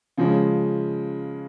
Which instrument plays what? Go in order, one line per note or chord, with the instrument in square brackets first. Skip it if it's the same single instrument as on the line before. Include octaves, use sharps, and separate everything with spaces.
[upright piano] C#3 F3 G#3 C#4